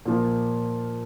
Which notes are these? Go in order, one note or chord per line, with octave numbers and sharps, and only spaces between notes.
A#2 F3 A#3